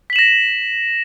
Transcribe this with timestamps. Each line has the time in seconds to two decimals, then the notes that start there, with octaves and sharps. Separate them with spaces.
0.10 B6
0.13 F#7
0.16 E7
0.19 A#6